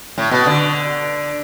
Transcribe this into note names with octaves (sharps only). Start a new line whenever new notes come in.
A2
B2
D3